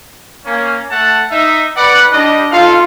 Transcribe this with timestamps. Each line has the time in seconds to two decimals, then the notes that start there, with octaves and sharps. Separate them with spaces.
0.46 A#3 C#4
0.90 A3 F#5 A5
1.31 D#4 E5
1.77 B4 D5 F#5 F#6
2.12 G3 D4 D#5
2.52 D#4 F4 A4 F5